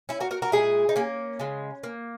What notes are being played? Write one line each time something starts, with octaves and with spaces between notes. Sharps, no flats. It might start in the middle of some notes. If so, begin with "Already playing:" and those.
C#4 E4
F#4 A#4
F#4 A#4
F#4 A#4
A#2 G#3 E4 G#4
D#4
A#3 C#4
C#3 G#3
A#3